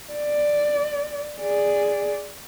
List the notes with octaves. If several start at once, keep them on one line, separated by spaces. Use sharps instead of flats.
D5
G#4 D5